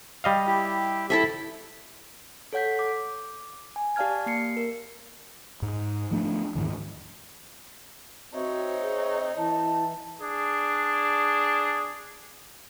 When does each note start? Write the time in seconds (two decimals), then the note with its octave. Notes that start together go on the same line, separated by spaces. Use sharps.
0.24 G3 D#5 F5
0.47 E4 G4
1.10 E4 A4 E5
2.53 A4 C#5 F#5 G6 B6
2.79 D6
3.76 G#5
3.96 G4 D5 F5 A5 F6 G#6
4.26 A#3 C7 C#7
4.57 A#4
5.62 G#2
6.11 F3 A3 C#4 D4
6.55 D#2 G#2 D#3 E3
8.34 C4 D#4 F#4 C#5 E5
8.81 G#4
9.37 E3 E4 A5
10.21 D4 G#4